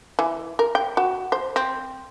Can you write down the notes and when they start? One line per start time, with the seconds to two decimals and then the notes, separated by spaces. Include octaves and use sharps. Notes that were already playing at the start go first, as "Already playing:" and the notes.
0.19 E3
0.59 A#4
0.75 G5
0.97 F#4
1.32 C5
1.56 C4